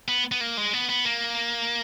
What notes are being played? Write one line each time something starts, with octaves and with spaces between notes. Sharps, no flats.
B3
B3
A#3
G#3
B3
B3
A#3